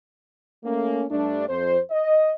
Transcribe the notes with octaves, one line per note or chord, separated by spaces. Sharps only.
A3 A#3 C#4
G2 G3 A3 D4
F2 C5
D#5